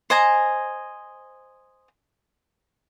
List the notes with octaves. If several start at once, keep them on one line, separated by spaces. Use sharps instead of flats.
C5 D#5 G#5 A#5